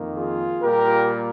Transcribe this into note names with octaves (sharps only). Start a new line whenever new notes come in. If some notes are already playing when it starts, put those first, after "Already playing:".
Already playing: F2 D#3 A#3
F4 G#4
A#2 G3 A#3 G4 A#4